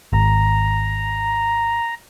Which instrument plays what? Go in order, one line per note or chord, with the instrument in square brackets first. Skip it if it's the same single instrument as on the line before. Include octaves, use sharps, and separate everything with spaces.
[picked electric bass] G#1 [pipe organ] A#5